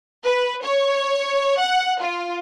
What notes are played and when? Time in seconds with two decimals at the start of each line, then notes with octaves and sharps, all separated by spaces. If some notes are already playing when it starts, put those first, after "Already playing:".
0.24 B4
0.63 C#5
1.59 F#5
2.02 F4